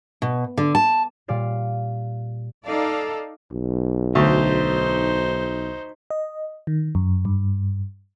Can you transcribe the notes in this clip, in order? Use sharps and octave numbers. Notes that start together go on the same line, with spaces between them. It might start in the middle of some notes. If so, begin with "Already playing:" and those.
B2
D3
A5
A#2 G3 D5 F5
D#4 A4 D5 F5
B1
D2 D#4 C5
D#5
D#3
F#2
G2